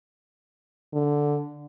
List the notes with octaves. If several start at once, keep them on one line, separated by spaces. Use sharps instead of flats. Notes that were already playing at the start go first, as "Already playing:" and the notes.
D3